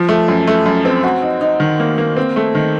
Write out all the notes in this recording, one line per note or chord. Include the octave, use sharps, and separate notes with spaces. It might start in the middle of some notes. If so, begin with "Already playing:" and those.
Already playing: F3
A3
F#2
A3
F#2
C4
F#4
D#4
D#4
D#3
A#3
A#3
C4
A3
D#3